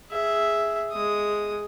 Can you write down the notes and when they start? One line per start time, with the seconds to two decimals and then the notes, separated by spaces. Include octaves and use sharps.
0.11 G#4 E5
0.92 G#3 D#6